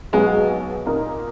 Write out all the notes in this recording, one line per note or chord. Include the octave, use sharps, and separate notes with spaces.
B1 B2 F#3 G#3
A#2 A#3 D#4 A#4